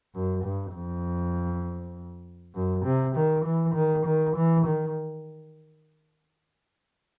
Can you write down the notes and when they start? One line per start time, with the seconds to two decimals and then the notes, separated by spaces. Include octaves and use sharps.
0.14 F#2
0.43 G2
0.74 F2
2.54 F#2
2.85 C3
3.15 D#3
3.45 E3
3.74 D#3
4.06 D#3
4.36 E3
4.66 D#3